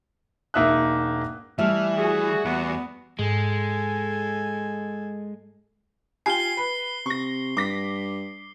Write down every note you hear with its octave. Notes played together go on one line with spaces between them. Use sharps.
E1 A#3 D#4 E5 D#6 F#6
E3 G3 A3 E5 F6
F#4 G#4
E2 B3
G#2 G#3 A4 G#5
F4 G4 G#5 C7 G7
B4
C3 C#6 A#6
G2 D6 A#6 B6